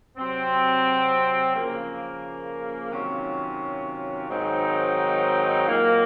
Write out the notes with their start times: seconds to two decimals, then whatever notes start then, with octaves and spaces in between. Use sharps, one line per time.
0.17 C3 F#3 C4
1.56 C#3 F3 A#3
2.92 C3 D#3 F#3 C#4 F4
4.29 G#2 D#3 F#3 C4 D#4
5.68 A#2 F#3 A#3